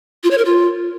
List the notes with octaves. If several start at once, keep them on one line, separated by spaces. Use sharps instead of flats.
F4
C#5
A#4
F4